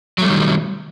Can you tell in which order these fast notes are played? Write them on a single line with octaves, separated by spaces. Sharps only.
F#3 A3 G3 D#3